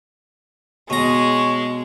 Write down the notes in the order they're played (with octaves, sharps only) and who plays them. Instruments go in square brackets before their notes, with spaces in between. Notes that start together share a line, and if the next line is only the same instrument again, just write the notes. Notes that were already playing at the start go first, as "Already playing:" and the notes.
[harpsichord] B2 A#5 [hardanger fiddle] G#3 [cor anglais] C#5